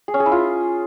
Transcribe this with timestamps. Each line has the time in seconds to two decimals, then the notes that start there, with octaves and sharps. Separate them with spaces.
0.08 G#4
0.14 C#4
0.20 G#4
0.26 E4
0.32 F4